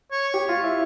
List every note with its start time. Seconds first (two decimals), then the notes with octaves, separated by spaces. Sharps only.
0.11 C#5
0.34 G4
0.49 F4
0.64 E4